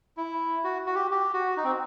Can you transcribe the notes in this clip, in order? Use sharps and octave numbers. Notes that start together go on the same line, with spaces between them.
E4
F#4
F#4
G4
G4
F#4
D#4
C4